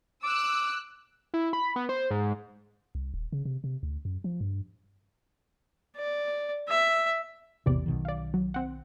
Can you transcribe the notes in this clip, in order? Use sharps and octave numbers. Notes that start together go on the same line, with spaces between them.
D6 E6 F#6
E4
B5
B3
C5
G#2
C2
D#1
C#3
C3
C3
D2
F#2
F3
G2
D5
E5
A1 E2 C3 B3 D5
B1 B2 D#3
D5 F5
F#3
C4 F#5